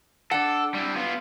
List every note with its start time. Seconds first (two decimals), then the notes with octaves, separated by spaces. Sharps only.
0.31 D4 A4 F#5
0.74 G3 E4
0.96 B3 F4